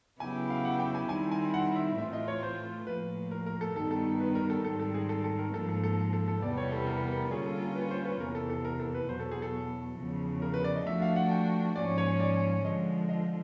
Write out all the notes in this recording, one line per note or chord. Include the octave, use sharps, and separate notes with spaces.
C#3 F#3 B3 E4 G4 G#5
F5
F#5
G5
G#5
D#3 G3 C4 E4 G#5
G#5
F#5
E5
A2 E3 A3 C4 F4 E5
D#5
C#5
C5
A2 F3 A#3 B4
A#4
A#4
A4
G2 D#3 G3 B3 D#4 A4
A4
B4
A#4
A4
G#2 D#3 G3 C4 A4
A4
G#4
A4
A4
A#4
G#2 F3 A#3 A4
A4
A4
A4
A4
E2 C3 E3 G3 B3 D5
C#5
A4
A#4
A#4
A#4
D3 G3 A#3 C#4 F4 G#4
A4
A#4
B4
C5
B4
E2 C3 E3 A#4
A4
A4
A#4
A4
B4
E2 B2 F#3 C5
A4
G#4
A4
E2 C#3 F3
A#4
B4
D5
D#5
F3 A3 D4 F#4 E5
F5
F#5
G5
G#2 F3 A#3 C#4 D5
C#5
D5
D3 F3 G#3 D#5
D#5